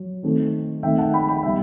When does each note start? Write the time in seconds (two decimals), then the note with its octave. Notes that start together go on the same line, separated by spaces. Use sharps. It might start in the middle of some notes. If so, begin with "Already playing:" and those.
Already playing: F#3
0.23 D#3 A3 C4 D#4
0.83 D#3 A3 C4 D#4 E5 G5
0.98 F#5 A5
1.13 G5 B5
1.29 G5 B5
1.43 B2 G3 D#4 E5 G5